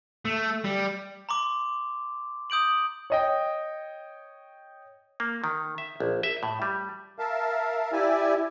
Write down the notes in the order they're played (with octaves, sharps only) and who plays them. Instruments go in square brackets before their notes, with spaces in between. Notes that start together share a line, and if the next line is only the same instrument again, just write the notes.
[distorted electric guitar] A3
G3
[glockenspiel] A#5 C6 D6
D#6 G6 D7 F#7
[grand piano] C#5 D#5 G5
[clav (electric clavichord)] A#3
D#3
E5
A#1
E5
A2
G3
[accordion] A#4 E5 F5 A5
E4 G4 D5 E5 G#5